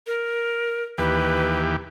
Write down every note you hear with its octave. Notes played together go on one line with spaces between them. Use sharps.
A#4
D#2 E3 G4 B4